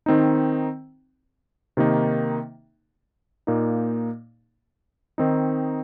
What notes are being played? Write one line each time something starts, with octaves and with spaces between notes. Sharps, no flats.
D#3 C4 D#4
C3 D#3 A#3 D#4
A#2 A#3 D#4
D#3 C4 D#4